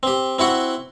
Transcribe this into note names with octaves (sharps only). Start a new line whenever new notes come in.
C4 G4
C4 E4 F#4 F#5